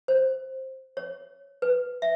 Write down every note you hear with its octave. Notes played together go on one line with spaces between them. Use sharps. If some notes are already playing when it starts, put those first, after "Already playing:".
C5
C#5
B4
E5